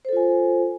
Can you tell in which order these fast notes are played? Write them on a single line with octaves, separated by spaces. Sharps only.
C5 A4 F4 G#5